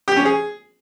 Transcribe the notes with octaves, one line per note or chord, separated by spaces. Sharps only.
G4
C#4
G#4